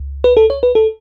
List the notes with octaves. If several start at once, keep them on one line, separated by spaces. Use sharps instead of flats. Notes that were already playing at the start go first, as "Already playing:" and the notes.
Already playing: C#2
B4
A4
C#5
B4
A4